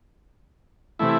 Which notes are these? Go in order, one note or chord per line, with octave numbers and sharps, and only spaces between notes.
C3 E3 A3 E4